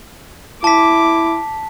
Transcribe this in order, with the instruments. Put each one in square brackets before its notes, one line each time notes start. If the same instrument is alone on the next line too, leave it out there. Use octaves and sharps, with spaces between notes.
[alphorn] E4 [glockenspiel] A5 B6 [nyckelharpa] D6